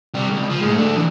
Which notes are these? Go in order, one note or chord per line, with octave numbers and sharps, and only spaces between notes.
G3 C4
C#2
F3
A2 G#3
A3 D4
E3 F#3